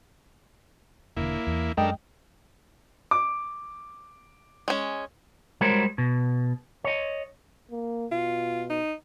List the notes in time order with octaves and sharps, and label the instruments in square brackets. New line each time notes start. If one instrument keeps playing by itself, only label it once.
[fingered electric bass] E1 D3 [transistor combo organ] A#3 E4
[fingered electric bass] E2
[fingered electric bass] F#2 [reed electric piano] G#3 D#5 G5 [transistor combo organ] D4 A4 A#4
[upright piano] D6
[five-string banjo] G#3 C#4
[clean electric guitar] G3 G#3 F#4 A#4 C5 C#5
B2
C#5 D#5
[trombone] A#3
[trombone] B2 [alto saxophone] F4
[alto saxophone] D#4